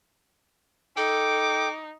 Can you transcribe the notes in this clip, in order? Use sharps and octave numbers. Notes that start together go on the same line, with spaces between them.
D#4 A4 G5 D6